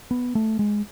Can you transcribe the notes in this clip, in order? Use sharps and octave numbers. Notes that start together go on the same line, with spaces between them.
B3
A3
G#3